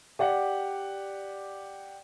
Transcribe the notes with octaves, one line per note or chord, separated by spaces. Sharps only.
G4 D5 F#5